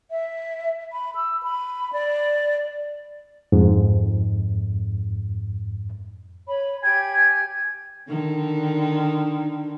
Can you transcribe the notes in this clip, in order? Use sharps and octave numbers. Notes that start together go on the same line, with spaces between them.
E5
B5
E6
B5
D5
F2 G#2
C#5 B5
G4 G5 G#5 G#6
D3 D#3